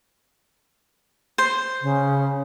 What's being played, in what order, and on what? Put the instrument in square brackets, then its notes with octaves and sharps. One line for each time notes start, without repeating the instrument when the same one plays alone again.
[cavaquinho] C5
[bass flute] C#3